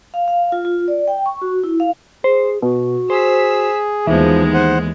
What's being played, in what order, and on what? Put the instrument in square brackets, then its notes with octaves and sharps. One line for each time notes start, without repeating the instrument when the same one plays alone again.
[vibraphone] F5
F5
F4
F4
D5
G5
C#6
F#4
E4
F5
[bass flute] G#4 [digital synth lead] C5
[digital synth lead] B2 [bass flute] F#4
[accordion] G#4 [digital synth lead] C5 [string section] E6 B6
[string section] D#2 G#3 B3 [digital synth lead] E3 [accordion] F3 [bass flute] D#4
[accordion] C5 F#5